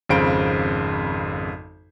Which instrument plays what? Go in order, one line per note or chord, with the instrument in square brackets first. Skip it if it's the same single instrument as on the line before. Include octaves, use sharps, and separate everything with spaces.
[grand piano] G#1 F2 C#3 C5 D7